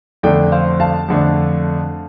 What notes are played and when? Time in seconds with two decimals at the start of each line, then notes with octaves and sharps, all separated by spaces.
0.23 F2 D3 A3 D4 D5 G5
0.52 C5 F5
0.80 F5 A5
1.08 F2 D3 A3 D4